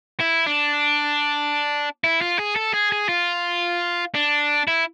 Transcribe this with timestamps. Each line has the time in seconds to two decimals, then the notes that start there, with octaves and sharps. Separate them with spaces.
0.20 E4
0.46 D4
2.04 E4
2.21 F4
2.39 G#4
2.56 A4
2.74 G#4
2.92 G#4
3.09 F4
4.14 D4
4.67 E4